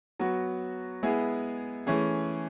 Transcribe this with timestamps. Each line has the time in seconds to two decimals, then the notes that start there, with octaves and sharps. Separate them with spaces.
0.20 F#3 B3 F#4
1.03 G#3 B3 E4 G#4
1.87 E3 A3 C#4 G#4